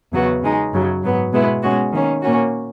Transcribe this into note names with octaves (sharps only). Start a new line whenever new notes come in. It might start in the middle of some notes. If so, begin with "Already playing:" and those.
E2 C#3 F#3 B3 F#4
C#3 G#3 D#4
F#2 C#3 F#3
G#2 F#3 B3
B2 G#3 B3 E4
B2 G#3 C#4 F#4
D#3 A#3 C#4
A#2 A#3 C#4 F#4